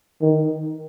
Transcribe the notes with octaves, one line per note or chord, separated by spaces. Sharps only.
D#3